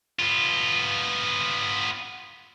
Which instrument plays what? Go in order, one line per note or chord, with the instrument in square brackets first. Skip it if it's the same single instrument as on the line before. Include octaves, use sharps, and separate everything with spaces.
[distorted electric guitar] B3 F4